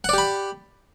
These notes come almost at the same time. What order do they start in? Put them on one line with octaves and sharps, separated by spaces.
F#5 D5 G4 B5